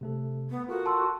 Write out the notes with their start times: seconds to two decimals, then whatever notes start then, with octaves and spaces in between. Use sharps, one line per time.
0.01 C3 A3 A4
0.50 B3
0.68 F4 F#4 A4 A#4
0.86 A5 C6 E6